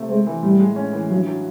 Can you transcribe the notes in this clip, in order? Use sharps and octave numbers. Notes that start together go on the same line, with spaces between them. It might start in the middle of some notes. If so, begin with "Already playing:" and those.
Already playing: C3 A3
G#3 C4
E3
A2 G3
G#3
C#4
E3
G2 F#3
F#3